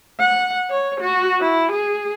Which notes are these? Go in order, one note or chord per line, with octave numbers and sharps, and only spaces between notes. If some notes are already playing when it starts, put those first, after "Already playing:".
F#5
C#5
F#4
E4
G#4